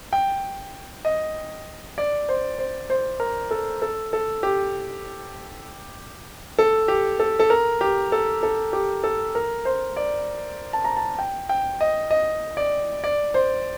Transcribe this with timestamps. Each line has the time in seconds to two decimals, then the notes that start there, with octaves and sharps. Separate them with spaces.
0.13 G5
1.05 D#5
1.98 D5
2.29 C5
2.59 C5
2.90 C5
3.20 A#4
3.51 A4
3.82 A4
4.13 A4
4.43 G4
6.59 A4
6.88 G4
7.20 A4
7.39 A4
7.50 A#4
7.81 G4
8.12 A4
8.43 A4
8.73 G4
9.04 A4
9.35 A#4
9.65 C5
9.97 D5
10.73 A5
10.84 A#5
10.97 A5
11.19 G5
11.49 G5
11.81 D#5
12.11 D#5
12.57 D5
13.04 D5
13.34 C5